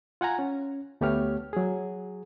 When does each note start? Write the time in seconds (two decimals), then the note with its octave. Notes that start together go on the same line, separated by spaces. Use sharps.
0.21 F4 F#5 G#5 A#5
0.39 C#4
1.01 D2 A3 B3 G4 C#5 F6
1.53 F#3 G#4